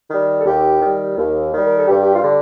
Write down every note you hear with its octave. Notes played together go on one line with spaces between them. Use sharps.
D#3 G3
A4
D#2 G4
D#3 G3
D#2
D#3 G3
A#4
A4
G2 G4
G4
F4
D3 G3